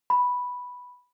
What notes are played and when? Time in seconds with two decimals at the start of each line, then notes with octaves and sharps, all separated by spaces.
0.10 B5